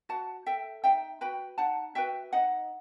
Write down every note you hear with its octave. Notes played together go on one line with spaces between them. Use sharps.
F#4 F#5 A5
A4 E5 G5
D#4 E5 G5
F#4 B4 G5 B5
D#4 F#5 A5
F#4 B4 E5 G5
D#4 D#5 F#5